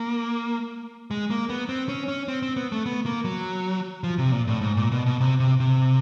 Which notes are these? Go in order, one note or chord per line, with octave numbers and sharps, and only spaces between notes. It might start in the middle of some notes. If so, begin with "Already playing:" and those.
Already playing: A#3
G#3
A#3
B3
C4
C#4
C#4
C4
C4
B3
A3
B3
A#3
F#3
F3
C3
A#2
A2
G#2
A#2
B2
B2
C3
C3
C3